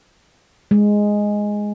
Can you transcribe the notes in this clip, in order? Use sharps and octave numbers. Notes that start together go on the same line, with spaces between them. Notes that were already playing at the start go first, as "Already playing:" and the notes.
G#3